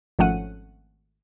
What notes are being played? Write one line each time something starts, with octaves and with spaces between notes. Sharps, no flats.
G#1 F3 A3 C#4 F#5 D#7